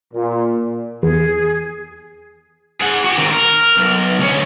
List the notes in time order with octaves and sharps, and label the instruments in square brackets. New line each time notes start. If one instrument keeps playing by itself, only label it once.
[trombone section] A#2
[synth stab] E2 [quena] G#4
[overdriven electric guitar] G#4 F#5
F#4 G4
D#3 C4
A#4
B1
D2 C#4